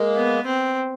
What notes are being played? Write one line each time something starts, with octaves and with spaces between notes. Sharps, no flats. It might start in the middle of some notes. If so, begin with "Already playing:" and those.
Already playing: G#3 A#3
B3
C4